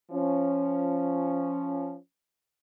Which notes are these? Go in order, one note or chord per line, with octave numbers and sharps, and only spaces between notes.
F3 C#4